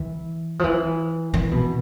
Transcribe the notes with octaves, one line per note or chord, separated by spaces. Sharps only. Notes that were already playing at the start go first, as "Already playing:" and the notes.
Already playing: E3
F3
E3
E3
B2